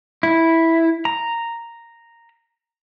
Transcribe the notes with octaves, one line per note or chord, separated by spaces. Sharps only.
E4
A#5